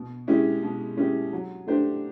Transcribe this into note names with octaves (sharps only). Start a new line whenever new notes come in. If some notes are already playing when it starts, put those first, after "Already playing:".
Already playing: B2
G#3 C#4 E4 G4
B2
G#3 C#4 E4 G4
F#3
A3 D4 G4 C5